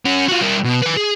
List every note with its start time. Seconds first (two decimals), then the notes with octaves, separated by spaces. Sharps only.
0.06 C#4 F#4
0.28 F4 F#4
0.41 G3 A#4
0.64 B2
0.82 B4 G#5
0.97 G#4